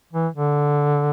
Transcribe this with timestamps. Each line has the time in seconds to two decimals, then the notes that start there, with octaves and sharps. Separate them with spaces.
0.13 E3
0.34 D3